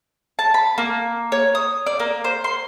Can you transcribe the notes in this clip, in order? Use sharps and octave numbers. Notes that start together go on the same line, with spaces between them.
A5
B5
A#3
C#5
D#6
D5
A#3
C5
C6